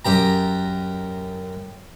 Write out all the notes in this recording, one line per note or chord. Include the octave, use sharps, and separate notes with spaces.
F#2 G4 A#5